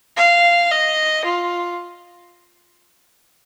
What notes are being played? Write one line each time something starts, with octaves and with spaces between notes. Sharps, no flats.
F5
D#5
F4